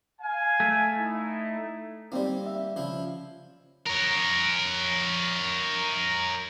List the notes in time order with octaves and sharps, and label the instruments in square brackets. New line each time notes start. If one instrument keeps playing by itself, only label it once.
[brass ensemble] F5 G#5
[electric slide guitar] A3
[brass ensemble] D#4 E4
[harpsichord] G3 A#3 [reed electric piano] C4 D#4
[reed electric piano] E5
[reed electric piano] C#3 C#4 [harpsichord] F3 E4
[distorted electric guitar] A#4 C#5